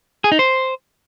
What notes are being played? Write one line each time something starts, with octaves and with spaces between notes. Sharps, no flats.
G#4
D#4
C5